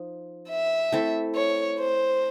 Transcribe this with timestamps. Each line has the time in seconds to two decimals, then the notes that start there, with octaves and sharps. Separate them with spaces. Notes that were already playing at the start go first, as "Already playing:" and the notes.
Already playing: F3 D#4
0.49 E5
0.92 A3 C4 E4 A4
1.36 C#5
1.79 C5